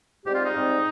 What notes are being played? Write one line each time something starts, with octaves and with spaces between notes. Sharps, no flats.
G#2 G3 C4 G4
F4
D#4
G#2 G3 C4